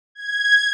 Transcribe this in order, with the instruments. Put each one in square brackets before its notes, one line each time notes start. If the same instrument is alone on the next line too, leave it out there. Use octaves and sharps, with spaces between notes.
[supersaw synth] G#6